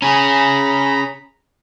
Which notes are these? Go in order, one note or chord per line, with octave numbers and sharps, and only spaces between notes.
C#4 G#4 A#5 B5